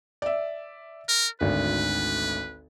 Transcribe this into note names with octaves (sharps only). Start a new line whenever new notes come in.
D5 E5
A#4
G#1 D2 B4